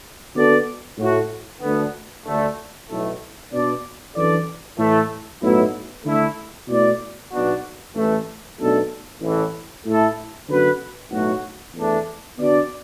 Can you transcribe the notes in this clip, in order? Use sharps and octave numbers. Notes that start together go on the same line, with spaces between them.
D3 B3 F#4 A4 D5
A2 A3 F#4
D2 D3 B3
D2 D3 A3
B1 A2 A3
B2 B3 D4 B4 D5
F#2 E3 D4 A4 D5
A2 E3 A3
B1 A2 F#3 B3 E4
D3 A3 E4
B2 A3 E4 D5
B1 B2 B3 D4 F#4
A1 A2 E3 A3
B1 B2 A3 D4 A4
A1 A2 E3
A2 A3 E4 A4
F#2 D3 B3 F#4 B4
B1 A2 F#3 A3 F#4
E2 E3 A3 D4
D3 B3 D4 F#4 D5